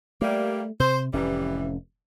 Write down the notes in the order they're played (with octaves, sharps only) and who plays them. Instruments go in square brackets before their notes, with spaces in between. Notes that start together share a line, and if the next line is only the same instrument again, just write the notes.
[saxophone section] G3 A#3 [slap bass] A3
[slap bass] C3 [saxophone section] C5
[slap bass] F1 A2 C#4 [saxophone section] E3 G3